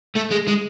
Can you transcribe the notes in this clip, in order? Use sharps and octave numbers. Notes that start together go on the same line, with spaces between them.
A3
G#3
G#3